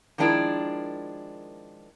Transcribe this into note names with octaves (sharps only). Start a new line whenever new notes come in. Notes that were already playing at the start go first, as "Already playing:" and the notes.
D#3 F3 G#3 D4 E4 A#4